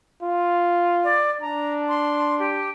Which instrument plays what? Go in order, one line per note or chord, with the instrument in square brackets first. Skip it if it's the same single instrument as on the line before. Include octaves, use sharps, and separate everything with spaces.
[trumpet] F4
[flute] D5
[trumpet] D4 [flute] A#5
[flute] C6
G4